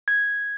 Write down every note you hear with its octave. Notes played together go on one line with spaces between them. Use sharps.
G#6